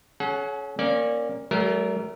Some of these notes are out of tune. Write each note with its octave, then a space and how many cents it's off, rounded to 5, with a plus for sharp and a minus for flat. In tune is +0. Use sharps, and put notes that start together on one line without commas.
C#4 +5 G#4 +45 F#5 +0
A#3 +0 C#4 -25 D5 +0
F#3 +45 A3 -30 A#4 +0